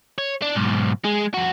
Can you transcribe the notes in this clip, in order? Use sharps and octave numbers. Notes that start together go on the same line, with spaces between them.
C#5
D4
B1 G#2
G#3
F2 F#4